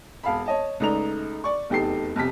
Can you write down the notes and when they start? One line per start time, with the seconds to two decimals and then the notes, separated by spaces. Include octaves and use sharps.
0.23 E1 F5 A5 B5
0.46 C#5 D#5 A5
0.80 C#2 A3 D#4 D5 A#5 F7
1.44 D5 C#6
1.69 F1 E2 D#4 G4 A4 C7
2.16 B1 F2 C3 B6